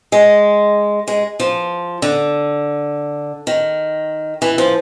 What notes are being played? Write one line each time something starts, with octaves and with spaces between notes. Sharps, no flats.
G#3
G#3
F3
D3
D#3
E3
F3